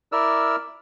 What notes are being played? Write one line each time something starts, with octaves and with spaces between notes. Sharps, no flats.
E4 A#4 D5 E6 F6